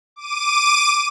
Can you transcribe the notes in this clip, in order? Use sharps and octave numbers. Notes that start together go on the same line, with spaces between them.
D6 D#7